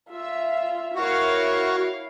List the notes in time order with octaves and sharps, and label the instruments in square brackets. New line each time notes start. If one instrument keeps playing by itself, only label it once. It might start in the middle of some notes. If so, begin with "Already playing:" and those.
[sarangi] F4 [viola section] E5
[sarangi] E4 [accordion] F#4 [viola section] A#4 C#5 F5